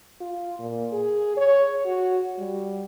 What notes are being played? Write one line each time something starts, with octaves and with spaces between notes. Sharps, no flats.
F4
A#2
G#4
C#5
F#4
G3